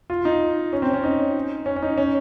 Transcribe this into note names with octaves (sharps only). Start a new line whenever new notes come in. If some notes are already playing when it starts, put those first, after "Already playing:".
F4
D#4
C#4
C4
C#4
D#4
C#4
C#4
D#4
C#4